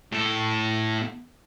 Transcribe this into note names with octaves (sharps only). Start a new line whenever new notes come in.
A2 A4